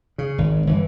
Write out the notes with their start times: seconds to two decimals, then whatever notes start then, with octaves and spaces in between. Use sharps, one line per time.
0.18 C#3
0.38 G#1
0.67 G1 E3